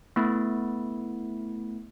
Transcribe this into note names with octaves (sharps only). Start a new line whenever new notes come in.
A3 B3 E4